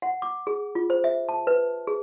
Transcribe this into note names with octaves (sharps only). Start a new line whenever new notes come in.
F#5
D6
G#4
F4
C5
E5
A5
B4
G#4